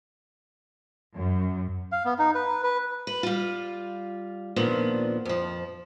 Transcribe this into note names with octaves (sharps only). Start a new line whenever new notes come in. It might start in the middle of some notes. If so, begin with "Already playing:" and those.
F#2
F5
B3
D#4
B4
B4
B4
G3 F4
D#2 A#2 F3 B3 D4
F2 F3